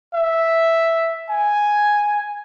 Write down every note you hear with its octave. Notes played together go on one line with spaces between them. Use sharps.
E5
G#5